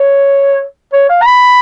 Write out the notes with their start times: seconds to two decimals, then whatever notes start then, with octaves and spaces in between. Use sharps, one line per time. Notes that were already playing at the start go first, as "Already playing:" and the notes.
Already playing: C#5
0.93 C#5
1.09 F5
1.22 A#5
1.26 B5